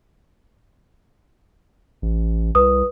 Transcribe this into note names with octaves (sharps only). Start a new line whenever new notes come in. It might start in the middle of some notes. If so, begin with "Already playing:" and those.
A1
C2 B4 D#6